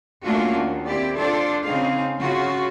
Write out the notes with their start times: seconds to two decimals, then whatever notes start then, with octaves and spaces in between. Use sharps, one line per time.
0.24 A3 A#3 C#4 D4 F4 F#4
0.56 D#2
0.86 C4 E4 G4 D5
1.17 D4 F4 A4 C5 D5
1.64 C#3 C4 D#4 G#4 F5
2.18 C#3 F4 F#4